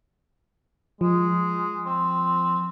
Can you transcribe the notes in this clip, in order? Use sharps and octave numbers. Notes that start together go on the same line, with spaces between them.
F3 G#3
C4